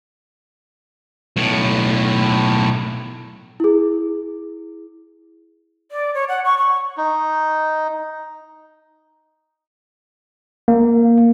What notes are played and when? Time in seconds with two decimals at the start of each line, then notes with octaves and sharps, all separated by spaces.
1.37 B1 A2
3.60 E4 G#4
5.92 D5
6.14 C#5
6.29 F#5
6.45 C#6
6.58 C#6
6.97 D#4
10.68 A#3